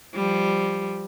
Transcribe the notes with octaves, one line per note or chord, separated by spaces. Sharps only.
F3 G3